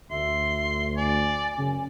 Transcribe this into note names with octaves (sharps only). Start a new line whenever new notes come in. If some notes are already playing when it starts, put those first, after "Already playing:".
D2 E5 C6
D5 G#5
F#2 C#3